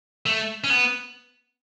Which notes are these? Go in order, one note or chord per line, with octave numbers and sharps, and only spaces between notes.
A3
C#4
B3